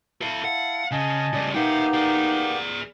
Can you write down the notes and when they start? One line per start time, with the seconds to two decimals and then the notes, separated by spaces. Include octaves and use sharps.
0.21 E4 A4 F5 A5
0.44 F5 F#5
0.91 C#3 D#5 G#5 A5
1.33 C#3 G3 D5
1.54 A#3 B3 D#4 G4 E5 G5
1.93 G#4 D5